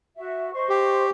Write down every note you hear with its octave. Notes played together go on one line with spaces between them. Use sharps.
F#4 E5
C5 D#5 C#6
G4